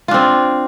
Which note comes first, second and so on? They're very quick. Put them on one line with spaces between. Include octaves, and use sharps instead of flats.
F4 D4 C4